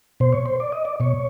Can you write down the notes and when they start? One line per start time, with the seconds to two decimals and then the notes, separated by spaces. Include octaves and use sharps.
0.20 B2 C5
0.33 C#5
0.46 C5
0.60 D5
0.72 D#5
0.85 D5
1.00 B2 C#5